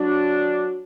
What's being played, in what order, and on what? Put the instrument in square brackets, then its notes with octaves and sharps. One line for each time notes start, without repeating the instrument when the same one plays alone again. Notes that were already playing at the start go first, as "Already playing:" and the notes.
Already playing: [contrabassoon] F#3 [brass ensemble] D4